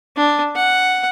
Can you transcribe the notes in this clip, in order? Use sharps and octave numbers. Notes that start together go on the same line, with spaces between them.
D4
F#5